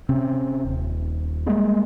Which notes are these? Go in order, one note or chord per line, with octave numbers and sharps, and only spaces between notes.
C3 C4 C#4
D#1
G3 G#3 A#3